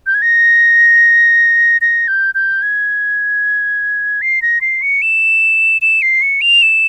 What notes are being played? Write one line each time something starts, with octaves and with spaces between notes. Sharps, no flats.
G6
G#6
A#6
A#6
G6
G6
G#6
C7
A#6
C7
C#7
E7
E7
C7
C#7
F7
E7